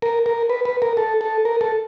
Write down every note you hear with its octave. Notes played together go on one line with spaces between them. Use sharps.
A#4
A#4
B4
B4
A#4
A4
A4
A#4
A4